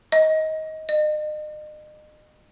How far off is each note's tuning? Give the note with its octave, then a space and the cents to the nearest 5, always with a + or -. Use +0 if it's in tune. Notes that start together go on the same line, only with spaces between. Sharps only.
D#5 +20
D#5 -40